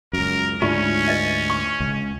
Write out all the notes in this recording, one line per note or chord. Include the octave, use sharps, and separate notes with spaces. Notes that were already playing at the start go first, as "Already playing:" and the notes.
C#2 F#2 A#4
D2 G#2 C#4 D4 F4 E5 C#6
B4 D#5 E5
C#6
C#2